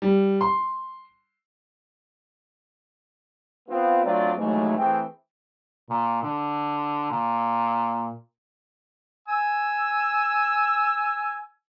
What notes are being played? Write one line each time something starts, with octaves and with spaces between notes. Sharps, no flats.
G3
C6
B3 C4 F4
F#3 A3 C4 D4 F4 D5
D#2 G#2 E3 F#3 G#3 A3
E3 A3 C4 G#4 G5
A#2
D3
A#2
G#5 E6